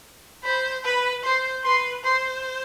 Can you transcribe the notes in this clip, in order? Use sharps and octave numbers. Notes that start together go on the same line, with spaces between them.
C5 B5
B4 B5
C5 C6
B4 C6
C5 C6